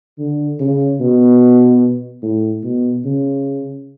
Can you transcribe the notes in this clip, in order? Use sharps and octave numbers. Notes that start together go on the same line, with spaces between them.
D3
C#3
B2
A2
B2
C#3